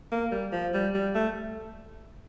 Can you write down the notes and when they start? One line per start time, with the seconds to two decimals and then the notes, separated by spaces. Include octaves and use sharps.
0.12 A#3
0.31 G3
0.52 F3
0.73 G3
0.94 G3
1.14 A3